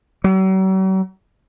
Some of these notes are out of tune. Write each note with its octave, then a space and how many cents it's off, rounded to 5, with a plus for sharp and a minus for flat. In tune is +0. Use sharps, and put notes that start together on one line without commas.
F#3 +45